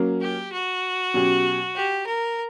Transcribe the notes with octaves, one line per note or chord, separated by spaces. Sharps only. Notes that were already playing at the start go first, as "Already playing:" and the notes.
Already playing: F#3 A#3 C#4
G4
F#4
B2 F#3 C#4 G4
G4
A#4